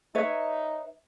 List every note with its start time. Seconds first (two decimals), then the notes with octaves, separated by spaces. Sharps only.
0.15 D#4 B4 C#5 E5